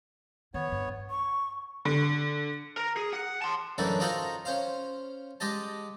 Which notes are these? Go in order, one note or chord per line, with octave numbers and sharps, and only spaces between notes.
D#3 B3 C#5
G2
C#6
D3
A#4
G#4
F#5
A5 C6
F#2 A2 D3 E3 D4 D#4
D#4 F4 F#4 A4 A#4 C5
C#4 C5 F5
G#3 G4 D#5 A5